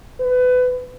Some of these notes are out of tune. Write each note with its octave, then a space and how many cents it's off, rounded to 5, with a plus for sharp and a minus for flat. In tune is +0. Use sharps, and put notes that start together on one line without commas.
B4 +25